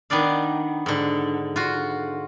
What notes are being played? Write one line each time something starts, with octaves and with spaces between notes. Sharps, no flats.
D#3 B3 D4 D5 F5
G#2 D3
F4 F#4